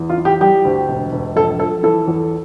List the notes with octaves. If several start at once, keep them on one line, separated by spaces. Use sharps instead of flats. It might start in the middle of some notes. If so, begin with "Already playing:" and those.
Already playing: E2
F4
E3
G4
G3 G4
D2
E1
E1
A#1 A4
F3 A4
E3 A4
E2